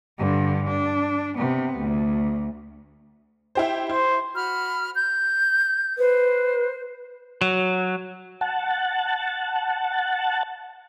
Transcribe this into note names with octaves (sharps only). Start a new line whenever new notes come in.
G2 D3
D4
C3 B3
D2
E4 G4 C5
E4 C5
F#4 B5 F6
G6
B4 C5
F#3
F#5 A5